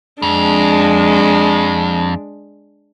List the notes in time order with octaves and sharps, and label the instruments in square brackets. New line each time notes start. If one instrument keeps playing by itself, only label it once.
[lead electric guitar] F2 [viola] G#3 D4